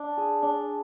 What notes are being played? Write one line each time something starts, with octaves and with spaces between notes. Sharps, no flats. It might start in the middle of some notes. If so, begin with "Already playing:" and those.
Already playing: D4
G#4
D4